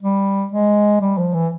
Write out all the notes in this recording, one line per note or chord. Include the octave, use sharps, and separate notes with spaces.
G3
G#3
G3
F3
E3